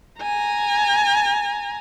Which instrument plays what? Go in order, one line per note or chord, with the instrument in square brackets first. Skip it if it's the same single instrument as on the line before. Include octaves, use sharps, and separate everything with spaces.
[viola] G#5 A#5